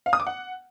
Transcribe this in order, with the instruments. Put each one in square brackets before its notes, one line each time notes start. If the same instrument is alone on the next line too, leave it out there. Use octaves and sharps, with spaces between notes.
[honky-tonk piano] F5
D#6
D6
F#5